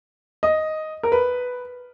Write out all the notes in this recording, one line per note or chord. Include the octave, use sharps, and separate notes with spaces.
D#5
A#4
B4